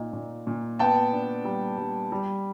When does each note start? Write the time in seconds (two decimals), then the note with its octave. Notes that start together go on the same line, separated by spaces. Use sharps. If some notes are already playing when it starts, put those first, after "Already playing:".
Already playing: A#2 D#4
0.13 A#2
0.47 A#2
0.79 B3 G5 A5
1.13 D4
1.45 G3
1.78 G3
2.12 G3